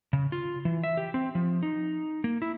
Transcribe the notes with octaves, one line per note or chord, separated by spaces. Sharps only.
C#3
F4
E3
E5
G4
C4
F3
D#4
A#3
E4